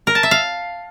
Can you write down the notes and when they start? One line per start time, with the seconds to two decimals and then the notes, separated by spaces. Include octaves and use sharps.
0.07 A#4
0.15 A5
0.23 E5
0.31 F5